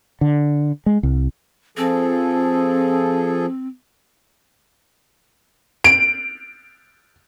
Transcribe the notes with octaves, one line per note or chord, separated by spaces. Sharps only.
D3
G#3
C2
F3 C4 G#4 A4
D7